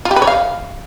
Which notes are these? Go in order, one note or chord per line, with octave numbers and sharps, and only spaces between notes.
F4
G4
B4
C#5
F5